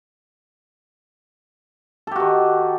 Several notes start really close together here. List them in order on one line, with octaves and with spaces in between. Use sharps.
A4 G4 F#4 D#3